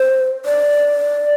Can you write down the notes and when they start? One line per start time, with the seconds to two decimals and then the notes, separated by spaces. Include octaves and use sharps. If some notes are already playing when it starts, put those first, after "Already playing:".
Already playing: C5
0.45 D5